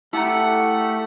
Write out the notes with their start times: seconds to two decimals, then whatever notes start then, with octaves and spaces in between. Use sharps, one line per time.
0.13 A3 E4 G4 A4 F#5 A#5